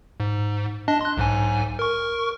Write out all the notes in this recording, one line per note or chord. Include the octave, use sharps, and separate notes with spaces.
G#2
D4 D#5 A5
C6 F#6
B1 G#2 G#5
A#4 C#6